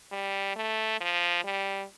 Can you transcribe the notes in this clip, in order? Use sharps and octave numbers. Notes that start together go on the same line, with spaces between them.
G3
A3
F3
G3